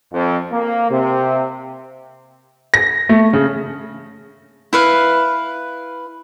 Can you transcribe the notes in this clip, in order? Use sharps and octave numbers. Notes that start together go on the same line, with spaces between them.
F2
A#3
C3
A#6
A3
C#3
E4 B4 F5